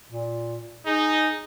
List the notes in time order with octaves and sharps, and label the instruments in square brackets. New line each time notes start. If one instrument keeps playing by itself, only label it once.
[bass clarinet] A#2
[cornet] D#4 [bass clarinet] G#4